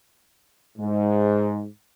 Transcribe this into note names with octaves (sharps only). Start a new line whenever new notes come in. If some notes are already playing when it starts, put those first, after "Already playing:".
G#2